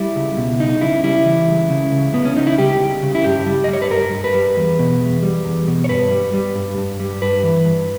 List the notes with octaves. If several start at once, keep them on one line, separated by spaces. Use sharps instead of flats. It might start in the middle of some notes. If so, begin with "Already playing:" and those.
Already playing: G3 E4
C#2
B2
C#2 D#4
C#3 E4
G3 E4
E3
C#2
C#3
C#2
C#3 B3
C#4
C#2 D#4
E4
G3 G4
C#2
C#3
E4
G2 G4
G3
D#5
G3 C#5
B4
G2 A#4
G2
B4
G3
E2
B2
E2
G3
E2
B2
C#5
G2 B4
G3
G3
G2
G2
G3
G2 B4
E3
G2